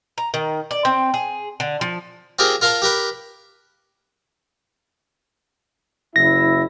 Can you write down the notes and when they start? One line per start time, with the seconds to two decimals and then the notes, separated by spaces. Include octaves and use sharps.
0.18 A#5
0.34 D#3
0.71 D5
0.85 C4
1.14 G#4
1.60 D3
1.81 F3
2.39 C4 F4 G4 G#4 A#4
2.61 F4 A#4 F5 A5 C6
2.82 G4 A#4 B4
6.16 F#1 E4 E5 A#6